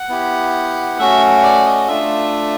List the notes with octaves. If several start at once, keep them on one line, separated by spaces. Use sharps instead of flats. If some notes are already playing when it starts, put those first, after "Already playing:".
Already playing: F#5
B3 E4 G4
A3 C#4 F#4 E5
D5
D#5
A3 D4 F4 E5